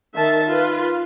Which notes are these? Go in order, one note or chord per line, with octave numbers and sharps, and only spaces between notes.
D#3 E5 A5
F4 B4